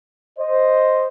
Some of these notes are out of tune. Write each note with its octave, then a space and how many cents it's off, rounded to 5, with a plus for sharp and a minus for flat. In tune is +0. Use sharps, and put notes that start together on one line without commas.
C5 +0 D#5 +0